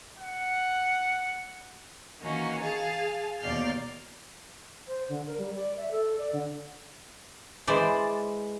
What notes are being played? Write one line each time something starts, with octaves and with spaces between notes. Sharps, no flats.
F#5
D#3 E3 A#3 C#4 F#4
G#4 F5 A5
D#2 B2 D5 F5 F6 G6
C5
D3
A#4
G3
D5
E5
A4
D5
D3
E3 G#3 C5 D5